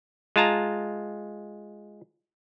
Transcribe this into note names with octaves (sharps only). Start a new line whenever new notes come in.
G#3 F4 A5 A#5